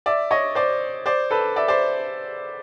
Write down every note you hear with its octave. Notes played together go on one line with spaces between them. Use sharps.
D5 E5
C#5 D#5
C5 D5
C5 D5
A4 B4
D5 E5
C5 D5